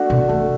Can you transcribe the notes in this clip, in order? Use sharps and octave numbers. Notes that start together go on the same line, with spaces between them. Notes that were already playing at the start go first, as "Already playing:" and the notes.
Already playing: A3 D4 F#4
B2
E2 A3